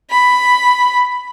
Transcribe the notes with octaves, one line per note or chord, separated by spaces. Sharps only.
B5